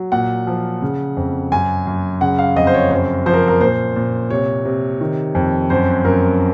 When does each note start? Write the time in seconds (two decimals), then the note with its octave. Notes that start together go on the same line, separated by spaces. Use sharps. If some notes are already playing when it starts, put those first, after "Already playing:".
Already playing: F#3
0.12 A#2 F#5
0.47 F3
0.82 C#3
1.17 F2
1.52 F#2 G#5
1.87 F#2
2.21 C#3 F#5
2.38 F5
2.56 F2 D#5
2.67 C5
2.74 C#5
2.91 F#2 C5
3.26 F3 C5
3.33 A#4
3.48 A#4
3.61 A#2 C5
3.96 A#2
4.30 C3 C#5
4.65 C3
5.01 D#3
5.35 F2
5.70 F#2 C5
6.05 F#2 A#4